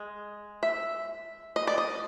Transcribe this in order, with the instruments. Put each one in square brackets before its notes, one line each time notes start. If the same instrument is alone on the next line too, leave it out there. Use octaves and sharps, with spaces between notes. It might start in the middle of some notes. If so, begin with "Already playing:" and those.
Already playing: [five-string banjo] G#3
E5
D#5
D5
D#5